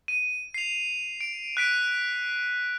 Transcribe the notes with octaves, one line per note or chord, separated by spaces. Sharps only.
D#7
C7 F7
D7
F#6 B6 D7